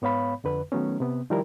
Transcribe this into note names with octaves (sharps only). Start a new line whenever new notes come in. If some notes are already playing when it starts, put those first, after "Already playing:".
G#2 B3 C#5 F5 B5
F2 D3 B4
D#3 F#3 A3 B3 C#4
C3 B3
D#3 F3 G3 E4 A#4